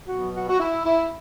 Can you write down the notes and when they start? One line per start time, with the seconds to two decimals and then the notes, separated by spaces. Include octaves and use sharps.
0.08 B2 F#3 B3 F#4
0.34 F#4
0.49 F#4
0.60 E4
0.86 E4